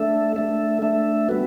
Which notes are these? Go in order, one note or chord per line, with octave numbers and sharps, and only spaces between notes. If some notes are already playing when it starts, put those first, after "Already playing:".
Already playing: A3 D4 A4 E5
A3 D4 A4 E5
A3 D4 A4 E5
G3 B3 F#4 B4